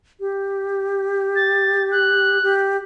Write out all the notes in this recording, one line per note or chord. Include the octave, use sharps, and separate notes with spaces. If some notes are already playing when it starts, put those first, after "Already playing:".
G4
A6
F#6
G4